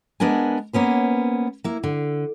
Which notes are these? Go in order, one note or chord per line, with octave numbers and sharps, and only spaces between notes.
G#3 B3 D4 A#4 G#5
A#3 B3 C#4 C5
A#3 E4
D3